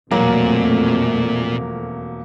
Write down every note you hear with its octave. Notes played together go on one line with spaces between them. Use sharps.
E1 F2 A#2 F#3 A3 A#3